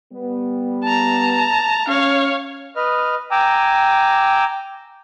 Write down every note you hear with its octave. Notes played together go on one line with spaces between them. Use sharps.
G3 B3
A5 A#5
C#4 C#5 F5
B4 D#5 F6
G5 G#5 A#5 D6 E6